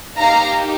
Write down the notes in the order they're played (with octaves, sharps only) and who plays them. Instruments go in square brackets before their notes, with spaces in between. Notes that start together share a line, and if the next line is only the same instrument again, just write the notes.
[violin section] A#3 D#4 G4 F5 A#5